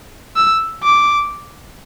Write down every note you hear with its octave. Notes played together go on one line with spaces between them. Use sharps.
E6
D6